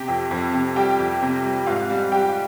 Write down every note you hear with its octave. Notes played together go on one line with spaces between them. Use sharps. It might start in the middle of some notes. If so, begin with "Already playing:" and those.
Already playing: C3 G4 G5
F2
F2
C3
G3 G4 G5
F2
C3
G3
G#2 F4 F5
G3
G3 G4 G5